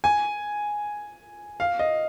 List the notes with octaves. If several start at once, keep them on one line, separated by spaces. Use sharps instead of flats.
G#5
F5
D#5